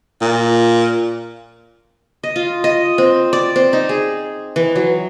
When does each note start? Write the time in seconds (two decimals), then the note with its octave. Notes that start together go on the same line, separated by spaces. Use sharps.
0.21 A#2
2.23 D#5
2.36 F4
2.64 D#5
2.98 C4
3.33 D5
3.56 C4
3.73 D#4
3.89 G#4
4.56 E3
4.76 F#3